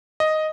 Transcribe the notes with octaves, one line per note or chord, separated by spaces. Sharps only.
D#5